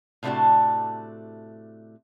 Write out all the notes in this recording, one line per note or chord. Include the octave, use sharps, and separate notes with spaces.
A2 C3 A3 D4 F#4 D5